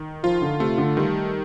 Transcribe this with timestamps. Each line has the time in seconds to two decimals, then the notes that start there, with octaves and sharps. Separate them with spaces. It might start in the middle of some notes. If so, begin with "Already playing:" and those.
Already playing: D#3
0.23 F3 F4
0.42 D3
0.60 C3 A3
0.78 D3
0.97 D#3 G3